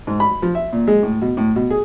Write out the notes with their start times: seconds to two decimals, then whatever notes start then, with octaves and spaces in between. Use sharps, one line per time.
0.07 G#2
0.20 B5
0.42 F3
0.55 E5
0.73 A#2
0.87 G#3
1.03 A2
1.22 B2
1.37 A2
1.56 B2
1.71 G#4